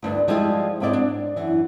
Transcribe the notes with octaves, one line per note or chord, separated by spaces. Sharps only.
D2 G2 D4
F3 G3 G#3 B3 E4 F4
D#2 G#2 C4 E4 D5 D#5
D4
F#2 E3